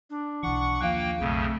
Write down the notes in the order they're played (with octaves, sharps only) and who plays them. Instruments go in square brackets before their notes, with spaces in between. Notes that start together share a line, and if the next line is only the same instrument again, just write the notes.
[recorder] D4
[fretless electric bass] B1 E3 [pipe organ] F#5 C#6
[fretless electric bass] D#2 F3 [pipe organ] A#3 G5 [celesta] F5 F#6
[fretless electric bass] B1 F#3 [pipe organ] F2 C#3 [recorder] A3